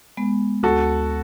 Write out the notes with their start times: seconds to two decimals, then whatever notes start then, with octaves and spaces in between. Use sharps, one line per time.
0.17 G#3 B3
0.63 D2 F#4 A4